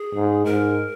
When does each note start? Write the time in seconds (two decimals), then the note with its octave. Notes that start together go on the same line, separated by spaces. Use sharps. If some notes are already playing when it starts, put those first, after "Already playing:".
Already playing: G#4
0.15 G#2
0.45 G#2 A#4